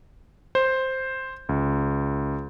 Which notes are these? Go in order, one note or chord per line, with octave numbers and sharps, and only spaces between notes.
C5
C#2